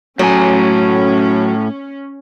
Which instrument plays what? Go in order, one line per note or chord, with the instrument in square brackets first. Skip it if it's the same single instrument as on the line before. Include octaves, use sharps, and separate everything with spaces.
[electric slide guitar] A2 G#5 [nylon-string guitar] F#3 [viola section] C#4